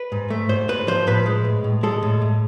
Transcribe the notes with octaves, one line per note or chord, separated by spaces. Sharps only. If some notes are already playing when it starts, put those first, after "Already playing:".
Already playing: B4
G#2
A3
G#2 C5
G#2 B4
F3 C5
A2 B4
G#3
A2
A2
G#3 A4
A2
A2